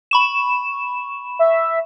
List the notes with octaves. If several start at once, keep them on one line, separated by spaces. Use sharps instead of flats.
B5 C#6 E7
E5